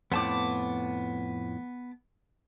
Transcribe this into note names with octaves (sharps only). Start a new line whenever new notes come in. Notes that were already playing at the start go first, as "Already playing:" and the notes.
F2 A2 B3 A5 D6